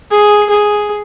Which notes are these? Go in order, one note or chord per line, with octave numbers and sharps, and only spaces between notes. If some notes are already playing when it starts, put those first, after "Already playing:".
G#4
G#4